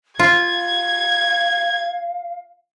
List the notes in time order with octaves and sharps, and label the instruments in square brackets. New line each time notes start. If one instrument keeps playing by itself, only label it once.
[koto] F4 [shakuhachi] F5 [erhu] G#6